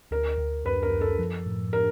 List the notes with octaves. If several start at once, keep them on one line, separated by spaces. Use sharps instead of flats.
D2 A#4
D2
F#2 B4
A#4
F#2
A4
F3
A2
A#4